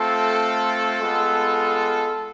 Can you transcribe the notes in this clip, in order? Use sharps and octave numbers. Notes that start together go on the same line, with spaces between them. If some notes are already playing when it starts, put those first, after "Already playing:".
Already playing: A3 C4 F4 A4
G#3 B3 F4